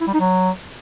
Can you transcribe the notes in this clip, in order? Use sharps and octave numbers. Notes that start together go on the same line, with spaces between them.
E4
G3
D#4
F#3